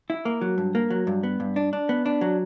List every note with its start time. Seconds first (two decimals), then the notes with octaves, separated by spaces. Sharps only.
0.10 E4
0.25 A#3
0.41 F#3
0.58 G2
0.75 A#3
0.90 F#3
1.07 G2
1.23 B3
1.40 G2
1.56 D4
1.73 D4
1.89 B3
2.06 D4
2.21 F#3